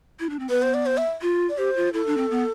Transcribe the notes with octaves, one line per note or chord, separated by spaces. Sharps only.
E4
D4
C4
B3 B4
C5
D5
C5
E5
F4
D5
G4 C5
F4
E4 A4
D4
C4
B3